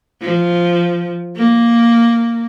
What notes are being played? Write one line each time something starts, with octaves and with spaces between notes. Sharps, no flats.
F3
A#3